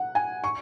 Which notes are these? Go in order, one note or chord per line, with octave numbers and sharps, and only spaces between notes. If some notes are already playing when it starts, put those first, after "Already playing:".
Already playing: F#5
G#5
C#6